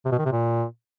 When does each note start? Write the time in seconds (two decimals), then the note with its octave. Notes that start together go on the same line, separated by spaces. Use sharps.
0.05 C3
0.12 B2
0.19 D#3
0.25 C3
0.32 A#2